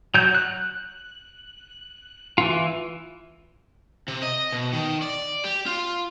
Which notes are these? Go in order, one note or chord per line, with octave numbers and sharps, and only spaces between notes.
F#3 G6
F#6
E3 F4
C3
D#5
B2
D#3
D5
G4
F4